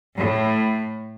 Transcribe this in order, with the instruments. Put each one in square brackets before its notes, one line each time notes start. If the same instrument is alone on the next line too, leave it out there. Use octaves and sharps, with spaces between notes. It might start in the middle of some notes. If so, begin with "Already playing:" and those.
[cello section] A2